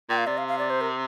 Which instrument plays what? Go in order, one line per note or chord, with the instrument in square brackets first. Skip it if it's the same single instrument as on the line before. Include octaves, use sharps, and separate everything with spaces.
[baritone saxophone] A#2 [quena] G5
[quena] F5
[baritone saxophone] C3 [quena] D5
[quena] F5
F5
D5
C5
A#4